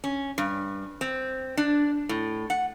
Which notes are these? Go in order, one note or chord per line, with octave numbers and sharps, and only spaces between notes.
C#4
G2
C4
D4
A2
F#5